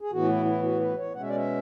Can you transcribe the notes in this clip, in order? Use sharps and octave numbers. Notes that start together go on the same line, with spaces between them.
G#4
A2 E3 B3 F#4
E4
E4
F#4
B4
C#5
B2 G#3 C#4 F#5
E5
D5
E5